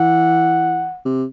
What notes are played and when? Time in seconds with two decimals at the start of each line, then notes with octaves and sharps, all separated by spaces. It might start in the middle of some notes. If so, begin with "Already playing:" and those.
Already playing: E3 F#5
1.05 C3